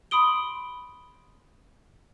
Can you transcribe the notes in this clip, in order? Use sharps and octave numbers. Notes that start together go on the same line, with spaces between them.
B5 C6 D#6 D7 G7